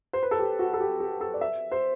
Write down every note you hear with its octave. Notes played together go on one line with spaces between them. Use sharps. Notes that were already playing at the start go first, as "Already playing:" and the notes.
C5
B4
A4
G4
F#4
A4
G4
G4
A4
D5
E5
C5